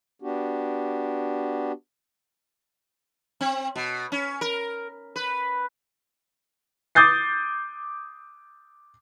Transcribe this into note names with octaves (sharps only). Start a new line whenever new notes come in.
B3 D4 F#4 G4
C4
B2
C#4
A#4
B4
D6 D#6 G6 A6 C7